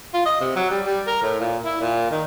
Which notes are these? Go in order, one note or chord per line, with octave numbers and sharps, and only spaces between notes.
F4
D#5
C3
F#3
G3
G3
A#4
A2
A#2
E4
A#2
D#3